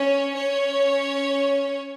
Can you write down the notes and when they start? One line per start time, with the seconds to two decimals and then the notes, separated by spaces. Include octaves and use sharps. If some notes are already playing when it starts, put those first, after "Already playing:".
Already playing: C#4 C#5
0.34 C#4 C#5